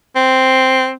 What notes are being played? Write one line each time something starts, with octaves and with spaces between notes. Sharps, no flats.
C4